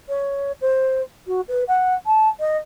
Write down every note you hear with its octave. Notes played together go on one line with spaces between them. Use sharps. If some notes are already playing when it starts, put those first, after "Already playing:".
C#5
C5
F#4
B4
F#5
A5
D#5